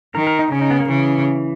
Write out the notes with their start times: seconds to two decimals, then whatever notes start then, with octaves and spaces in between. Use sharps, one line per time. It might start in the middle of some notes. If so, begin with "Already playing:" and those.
0.15 D#3 A#4
0.27 A#4
0.39 D#4
0.51 C#3 C#4
0.61 D#4
0.71 B3
0.80 A#3
0.89 C#3 E3